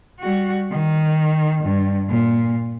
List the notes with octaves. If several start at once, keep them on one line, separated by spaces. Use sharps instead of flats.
G3 F#4
D#3
G2
A#2